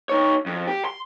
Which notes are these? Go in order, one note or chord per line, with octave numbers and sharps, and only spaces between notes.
D#4 C#5
F2
G4
C6